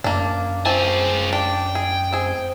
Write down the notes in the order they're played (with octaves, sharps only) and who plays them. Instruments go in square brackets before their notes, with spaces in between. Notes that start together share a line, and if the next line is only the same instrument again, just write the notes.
[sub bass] F#2 [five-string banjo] A#3 D4
[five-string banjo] C4 C5 A5 [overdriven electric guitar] F4 G#4
[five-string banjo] D4 [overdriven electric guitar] G5
[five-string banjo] G#4
C4 G#4